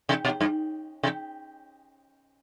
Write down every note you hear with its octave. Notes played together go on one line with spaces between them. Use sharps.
C3
B2
G2
C3